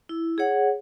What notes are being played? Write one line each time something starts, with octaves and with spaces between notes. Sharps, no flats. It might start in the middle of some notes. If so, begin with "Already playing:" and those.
E4
G#4 C#5 F#5